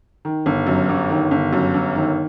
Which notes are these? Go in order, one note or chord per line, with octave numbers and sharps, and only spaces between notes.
D#3
G1
F#2
G1
D#3
G1
F#2
G1
D#3